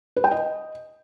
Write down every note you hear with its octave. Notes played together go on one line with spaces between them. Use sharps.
B4
G5
D#5